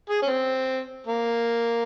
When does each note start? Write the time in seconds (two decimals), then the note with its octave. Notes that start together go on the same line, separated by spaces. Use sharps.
0.10 G#4
0.22 C#4
0.26 C4
1.06 A#3